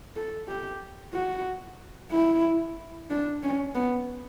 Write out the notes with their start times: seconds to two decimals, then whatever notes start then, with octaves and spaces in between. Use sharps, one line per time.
0.16 A4
0.48 G4
1.13 F#4
2.12 E4
3.10 D4
3.43 C#4
3.75 B3